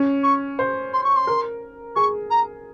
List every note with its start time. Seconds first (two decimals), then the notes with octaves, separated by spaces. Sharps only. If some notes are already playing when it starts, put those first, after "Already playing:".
Already playing: C#4
0.23 C#6
0.59 C5
0.93 C6
1.04 C#6
1.16 C6
1.27 A#4
1.96 G#4 C#6
2.30 A#5